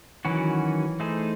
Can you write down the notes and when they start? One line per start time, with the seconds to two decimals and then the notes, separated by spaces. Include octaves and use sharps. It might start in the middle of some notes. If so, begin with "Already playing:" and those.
0.25 D#3 E3 F#3 C#4 F#4
1.00 A3 D#4 G#4 C5